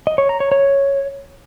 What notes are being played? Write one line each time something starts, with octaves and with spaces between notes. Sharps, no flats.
D#5
C#5
A#5
C#5
C#5